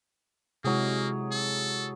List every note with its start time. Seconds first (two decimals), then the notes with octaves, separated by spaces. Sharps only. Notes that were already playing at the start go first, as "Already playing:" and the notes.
0.64 C3 F#3 G#3 A#3 E4 G#4
1.32 A4